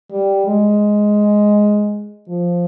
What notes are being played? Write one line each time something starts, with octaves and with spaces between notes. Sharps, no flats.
G3
G#3
F3